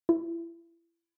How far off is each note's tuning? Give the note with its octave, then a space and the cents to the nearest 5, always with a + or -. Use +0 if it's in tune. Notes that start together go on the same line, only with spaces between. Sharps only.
E4 +30